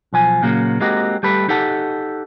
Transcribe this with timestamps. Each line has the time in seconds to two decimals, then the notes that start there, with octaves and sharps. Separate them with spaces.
0.13 B1 F3 G#5
0.42 A#2 C#3 F#3 A#3
0.80 G#3 A#3 C4 D#4 F#4 G4
1.23 G3 A3 G4 A4 B4
1.49 D#4 G4 A4 F#5 A5